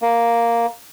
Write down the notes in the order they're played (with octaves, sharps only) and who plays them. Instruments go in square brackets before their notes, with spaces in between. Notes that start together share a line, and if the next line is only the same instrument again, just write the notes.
[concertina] A#3